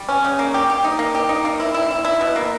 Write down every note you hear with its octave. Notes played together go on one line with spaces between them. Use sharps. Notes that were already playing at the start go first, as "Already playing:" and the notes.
Already playing: G3
C#4
C#3
A#3
G4
G4
D#4
A#3
G4
D#4
A#3
E4
E4
E4
E4
B2
A#3